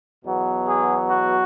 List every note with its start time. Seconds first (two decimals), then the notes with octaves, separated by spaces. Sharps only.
0.24 E2 B2 F#3 B3
0.67 G#4
1.10 F#4